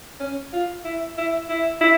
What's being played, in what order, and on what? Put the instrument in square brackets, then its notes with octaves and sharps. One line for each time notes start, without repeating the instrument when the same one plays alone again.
[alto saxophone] C#4
F4
E4
E4
E4
E4